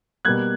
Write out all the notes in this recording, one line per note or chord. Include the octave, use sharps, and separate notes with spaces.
B2 G3 A#3 F#6 G#6